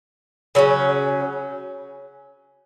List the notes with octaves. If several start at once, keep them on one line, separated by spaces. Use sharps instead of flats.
C#3 F#3 C#4